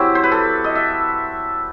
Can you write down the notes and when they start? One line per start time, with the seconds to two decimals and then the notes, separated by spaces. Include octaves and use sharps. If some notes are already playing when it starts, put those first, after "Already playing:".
Already playing: F#3 C4 E4 G4
0.15 C5
0.23 B4
0.32 A4
0.64 D#5
0.75 E5